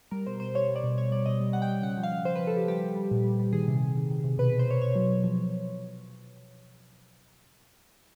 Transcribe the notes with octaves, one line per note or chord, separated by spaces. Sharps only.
G3 A#4
B2 C5
B2 C5
G3 C#5
G3
D5
B2
B2 C#5
G3 D5
B2 D#5
G3
G3 F#5
G5
G3
C#3 F#5
F3
F5
C#3
F3 C5
F3 B4
A4
F3 G4
G3 G4
G3
G3
A#2
G3
G3
D#3 G#4
C3
C3
D#3
D#3
C3
B2 B4
B2 B4
C5
B2 C#5
B2 C#5
F#3
B2
F3
F3